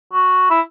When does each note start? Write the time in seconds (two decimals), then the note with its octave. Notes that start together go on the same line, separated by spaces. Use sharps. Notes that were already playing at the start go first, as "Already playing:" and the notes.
0.13 F#4
0.50 E4